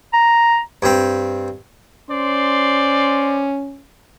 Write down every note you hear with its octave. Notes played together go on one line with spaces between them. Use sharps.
A#5
G2 C4
C#4 C5 D5 C6